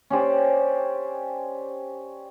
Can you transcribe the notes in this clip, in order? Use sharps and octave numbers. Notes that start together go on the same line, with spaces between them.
C#4 G4 C5 D5